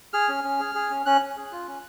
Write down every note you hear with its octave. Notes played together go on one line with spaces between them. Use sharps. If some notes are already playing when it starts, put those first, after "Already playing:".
G#4 F6
C#4
C#4
G#4
G#4
C#4
C#4 F#6
C#4
G#4
F4
C#4